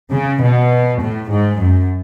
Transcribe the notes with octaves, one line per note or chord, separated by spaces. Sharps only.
C#3
B2
A2
G#2
F#2